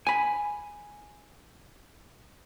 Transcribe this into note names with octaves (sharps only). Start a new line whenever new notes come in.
G#5 B5